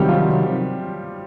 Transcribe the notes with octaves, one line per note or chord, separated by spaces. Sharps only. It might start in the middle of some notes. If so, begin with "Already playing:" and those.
Already playing: C3 D#3 F#3 G3 G4
F3 F4